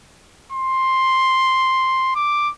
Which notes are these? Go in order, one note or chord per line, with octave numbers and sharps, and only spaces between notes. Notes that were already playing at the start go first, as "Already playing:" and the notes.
C6
D6